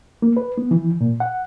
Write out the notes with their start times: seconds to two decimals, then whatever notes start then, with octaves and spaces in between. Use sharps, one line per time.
0.22 A#3
0.37 B4
0.58 B3
0.71 E3
1.01 A#2
1.20 F#5